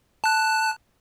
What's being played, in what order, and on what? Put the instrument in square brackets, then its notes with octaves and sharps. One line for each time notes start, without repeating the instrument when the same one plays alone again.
[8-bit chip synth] A5 F#6